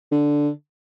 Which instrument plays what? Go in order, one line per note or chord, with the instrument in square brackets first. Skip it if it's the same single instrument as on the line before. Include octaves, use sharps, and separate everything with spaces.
[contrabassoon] D3